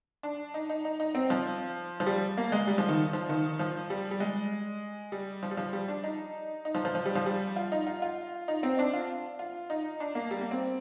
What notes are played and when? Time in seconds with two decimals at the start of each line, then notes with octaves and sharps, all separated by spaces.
0.23 D4
0.54 D#4
0.69 D#4
0.85 D#4
1.00 D#4
1.15 C4
1.30 F3
2.00 F3
2.06 G3
2.37 A#3
2.52 G#3
2.67 G3
2.78 F3
2.88 D#3
3.13 F3
3.29 D#3
3.59 F3
3.90 G3
4.11 G3
4.20 G#3
5.12 G3
5.43 F3
5.51 G3
5.57 F3
5.73 G3
5.88 D4
6.04 D#4
6.65 D#4
6.75 F3
6.85 F3
6.95 F3
7.05 G3
7.15 F3
7.26 G3
7.56 F4
7.72 D#4
7.87 F4
8.02 F4
8.48 D#4
8.63 C4
8.79 D4
8.93 F4
9.39 F4
9.70 D#4
10.00 D4
10.15 A#3
10.31 G3
10.41 A#3
10.51 C4